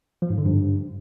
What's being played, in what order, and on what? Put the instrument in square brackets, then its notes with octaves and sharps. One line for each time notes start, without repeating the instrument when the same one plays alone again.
[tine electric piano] F3
G#2
D3
G2